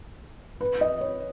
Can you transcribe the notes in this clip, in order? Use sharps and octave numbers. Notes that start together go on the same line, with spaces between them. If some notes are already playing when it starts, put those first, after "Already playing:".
B4
D#5
C#5